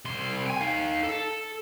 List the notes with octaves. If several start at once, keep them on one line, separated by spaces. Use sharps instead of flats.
C2 C6
G5 G#5
D#4 F5
A4